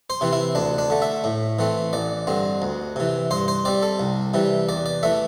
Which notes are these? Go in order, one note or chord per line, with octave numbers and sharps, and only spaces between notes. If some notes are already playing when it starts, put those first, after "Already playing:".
C5
C3 E3 C4
E4
D2 D4
D4
D3 A3
E5
A2
E3 A3 C4
A1 D5
G2 D3 C4
D2
C3 E3
G2 C5
C5
G3 C4 D5
A4
C2
C3 E3 G3
E2 D5
D5
E3 A3 E5